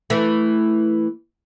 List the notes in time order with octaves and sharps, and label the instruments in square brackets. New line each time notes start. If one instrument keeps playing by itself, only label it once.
[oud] E3 A3